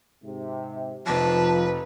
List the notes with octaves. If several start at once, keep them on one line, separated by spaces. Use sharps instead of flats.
G#2 C3
F1 F3 B4 A5 A#6